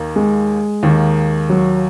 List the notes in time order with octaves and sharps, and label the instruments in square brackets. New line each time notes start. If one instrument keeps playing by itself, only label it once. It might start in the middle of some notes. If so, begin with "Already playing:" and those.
Already playing: [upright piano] D#2 D#3 A#3
[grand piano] G#3
[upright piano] D#2 D#3 A#3
[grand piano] F#3